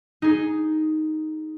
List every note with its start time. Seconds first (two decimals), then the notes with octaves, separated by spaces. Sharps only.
0.22 D#4 G#4